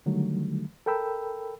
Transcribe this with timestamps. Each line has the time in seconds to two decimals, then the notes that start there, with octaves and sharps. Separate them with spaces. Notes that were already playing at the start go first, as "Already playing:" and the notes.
0.06 D3 D#3 F#3 G3 A3
0.86 A4 A#4 G5 B5 E6